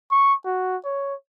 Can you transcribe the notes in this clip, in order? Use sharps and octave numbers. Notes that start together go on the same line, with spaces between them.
C#6
F#4
C#5